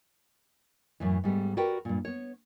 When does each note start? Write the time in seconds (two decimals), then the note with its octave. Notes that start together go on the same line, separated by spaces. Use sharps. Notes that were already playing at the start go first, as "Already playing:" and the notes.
1.00 F#2 A2 E3
1.24 G#2 G3 A3 B3
1.57 F#4 G4 A#4 B4 D5 G5
1.85 G2 A#2
2.05 B3 C#5